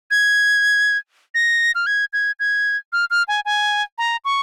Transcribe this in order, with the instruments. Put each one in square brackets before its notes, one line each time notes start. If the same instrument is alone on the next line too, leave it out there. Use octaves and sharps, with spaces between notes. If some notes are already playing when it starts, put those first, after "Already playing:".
[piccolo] G#6
A#6
F6
G#6
G#6
G#6
F6
F6
G#5
G#5
A#5
C#6